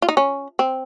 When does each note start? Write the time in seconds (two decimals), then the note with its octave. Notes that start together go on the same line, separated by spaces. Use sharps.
0.02 F4
0.09 D#4
0.17 C#4
0.59 C4